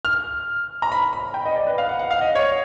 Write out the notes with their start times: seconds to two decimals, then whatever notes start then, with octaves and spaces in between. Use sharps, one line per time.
0.05 F6
0.82 A#5
0.92 B5
1.13 B5
1.34 G5
1.45 D#5
1.56 D5
1.67 B4
1.78 F5
1.89 F#5
1.99 F#5
2.11 F5
2.21 D#5
2.35 C#5